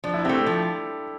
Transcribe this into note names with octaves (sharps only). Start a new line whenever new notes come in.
F3 D4
E4
A3 C4 G4
A4
F3